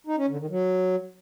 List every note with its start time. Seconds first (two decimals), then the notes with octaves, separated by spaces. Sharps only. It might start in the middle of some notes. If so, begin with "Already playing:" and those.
0.07 D#4
0.18 C#4
0.28 D3
0.39 D#3
0.50 F#3